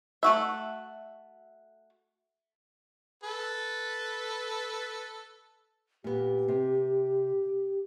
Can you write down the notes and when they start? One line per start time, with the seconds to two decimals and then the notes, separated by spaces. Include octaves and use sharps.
0.23 A3 F#4 E5
3.23 A4 B4
6.04 A#2 B3 G4
6.48 C3